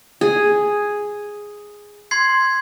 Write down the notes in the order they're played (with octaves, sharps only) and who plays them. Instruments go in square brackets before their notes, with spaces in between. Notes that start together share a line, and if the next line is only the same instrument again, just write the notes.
[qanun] G#4
[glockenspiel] C6 G#6 C7